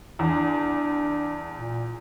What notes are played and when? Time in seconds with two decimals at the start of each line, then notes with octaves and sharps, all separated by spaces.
0.19 E2 D4
1.55 A#2